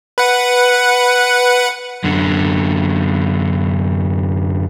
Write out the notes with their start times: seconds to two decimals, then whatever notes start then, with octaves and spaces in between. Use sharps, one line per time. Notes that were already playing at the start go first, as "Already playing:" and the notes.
0.18 B4 F#5
2.04 F#2 D3